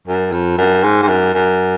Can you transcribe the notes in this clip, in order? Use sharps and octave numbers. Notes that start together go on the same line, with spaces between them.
F#2
F2
F#2
G#2
G#2
F#2
F#2